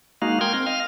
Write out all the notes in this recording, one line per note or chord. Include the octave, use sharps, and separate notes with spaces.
G#3 A#3 D#4 F#4 F5
A#4 G5 C6 F6 G#6
C4
D#5 F5 F6